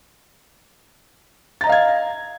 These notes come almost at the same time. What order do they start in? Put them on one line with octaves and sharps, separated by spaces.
A6 A#5 D#5 F5 G#6